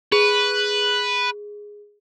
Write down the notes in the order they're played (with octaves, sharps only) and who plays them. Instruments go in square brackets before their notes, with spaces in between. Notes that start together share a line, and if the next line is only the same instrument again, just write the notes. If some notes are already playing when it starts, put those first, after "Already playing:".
[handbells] G#4 [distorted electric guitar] B4